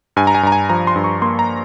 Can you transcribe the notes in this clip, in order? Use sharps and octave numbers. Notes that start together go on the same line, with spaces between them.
G2 G#5
A#5
G#5
G2 A#5
G#5
F3 A#5
C6
G2
C#6
A#3 C6
A#5